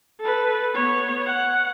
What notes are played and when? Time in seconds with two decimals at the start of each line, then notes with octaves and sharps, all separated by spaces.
0.20 A4 B4
0.73 B3 C#5
1.26 F#5